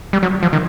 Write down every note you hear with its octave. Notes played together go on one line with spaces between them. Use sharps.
G3
F#3
F3
D#3